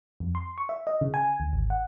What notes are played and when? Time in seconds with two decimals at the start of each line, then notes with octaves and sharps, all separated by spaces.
0.20 F2
0.35 C6
0.58 C#6
0.69 E5
0.87 D#5
1.01 C#3
1.14 G#5
1.40 D2
1.53 G#1
1.70 F#5